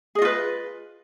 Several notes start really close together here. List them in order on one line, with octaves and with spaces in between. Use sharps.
G#4 D#5 F4 B4